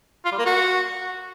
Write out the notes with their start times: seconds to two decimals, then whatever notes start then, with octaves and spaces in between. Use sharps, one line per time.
0.25 F4
0.32 G3
0.39 A#3
0.46 F#4